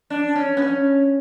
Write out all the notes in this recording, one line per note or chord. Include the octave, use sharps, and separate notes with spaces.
D4
C#4
B3
C#4